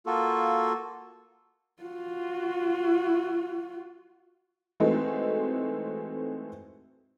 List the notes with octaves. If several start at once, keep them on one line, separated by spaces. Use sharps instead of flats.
A#3 F4 F#4 A4
F4 F#4
E3 G#3 A3 C4 D#4 F#4